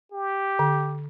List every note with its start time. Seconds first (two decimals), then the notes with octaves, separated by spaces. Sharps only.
0.12 G4
0.59 D3